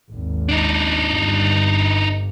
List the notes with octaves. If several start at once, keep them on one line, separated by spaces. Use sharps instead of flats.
G#1 D#2
D4 D#4
G1 G2